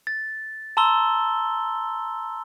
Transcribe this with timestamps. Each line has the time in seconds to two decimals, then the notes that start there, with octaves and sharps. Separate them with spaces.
0.07 A6
0.77 A5 A#5 C6 E6 G7